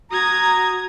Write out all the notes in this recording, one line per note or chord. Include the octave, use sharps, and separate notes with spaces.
F#4 A#5 D#6 G#6